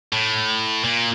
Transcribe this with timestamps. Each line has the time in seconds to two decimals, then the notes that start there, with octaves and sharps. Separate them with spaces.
0.13 A2
0.84 A#2